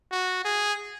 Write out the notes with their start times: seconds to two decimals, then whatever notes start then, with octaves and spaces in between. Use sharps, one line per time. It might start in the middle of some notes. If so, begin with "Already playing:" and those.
0.12 F#4
0.45 G#4